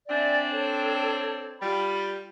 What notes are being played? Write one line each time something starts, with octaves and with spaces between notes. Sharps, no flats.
C4 D4 D5 E5 G#5
A4 C#5
G3 F4 B5